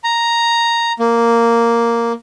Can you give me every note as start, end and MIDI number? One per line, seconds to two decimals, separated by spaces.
0.04 0.93 82
0.99 2.13 58